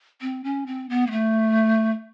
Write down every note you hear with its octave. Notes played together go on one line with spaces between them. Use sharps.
C4
C#4
C4
B3
A#3
A3